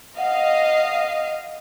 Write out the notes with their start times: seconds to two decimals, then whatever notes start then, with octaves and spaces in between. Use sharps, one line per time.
0.18 D#5 F5 F#5